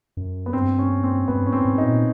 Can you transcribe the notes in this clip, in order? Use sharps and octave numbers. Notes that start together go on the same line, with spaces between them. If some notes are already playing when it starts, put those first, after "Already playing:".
F#2
B3
G2 C4
C#4
C4
G2 B3
G#2 C#4
C4
G#2
D#4
A#2